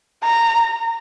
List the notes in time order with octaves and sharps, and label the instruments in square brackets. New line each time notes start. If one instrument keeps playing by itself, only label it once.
[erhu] A#5